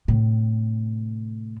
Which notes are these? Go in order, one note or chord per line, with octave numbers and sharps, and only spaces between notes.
A2 C3